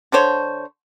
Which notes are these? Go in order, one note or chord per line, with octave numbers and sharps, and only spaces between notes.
D3 A4 C5 C#5